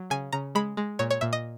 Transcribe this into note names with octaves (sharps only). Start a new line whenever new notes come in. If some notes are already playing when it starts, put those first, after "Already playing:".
Already playing: F#3
C#3 G#5
C#3 A#5
G#3 B5
G#3
A#2 C#5
C#5
A#2 E5
D#5